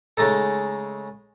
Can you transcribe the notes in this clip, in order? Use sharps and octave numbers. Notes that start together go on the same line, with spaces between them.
C#3 G#3 A3 D#4 A4